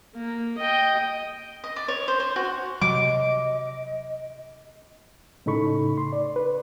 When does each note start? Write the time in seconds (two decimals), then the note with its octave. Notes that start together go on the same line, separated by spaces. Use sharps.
0.15 A#3
0.58 D#5 G5
1.64 D#5
1.76 D5
1.88 C#5
2.08 C5
2.20 C5
2.36 F#4
2.82 C3 F#3 D#5 D6
5.46 A2 C#3 D#4 A4 B5 C#6
5.98 C6
6.13 D5
6.36 B4